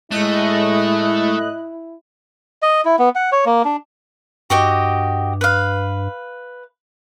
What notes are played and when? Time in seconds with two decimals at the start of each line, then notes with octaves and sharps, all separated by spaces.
0.11 A2 G#3 A3 E4 D#5 F#6
2.62 D#5
2.85 E4
2.99 B3
3.15 F#5
3.32 C#5
3.46 A#3
3.65 D4
4.50 G2 F#4 G4 D#5
5.41 B4 F5